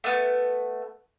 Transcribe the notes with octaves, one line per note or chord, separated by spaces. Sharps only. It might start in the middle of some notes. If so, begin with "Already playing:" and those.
A3 B3